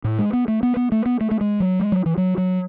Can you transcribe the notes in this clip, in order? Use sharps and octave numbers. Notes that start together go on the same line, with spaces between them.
A2
G#3
B3
A3
B3
B3
A3
B3
A3
A3
G#3
F#3
G#3
F#3
E3
F#3
F#3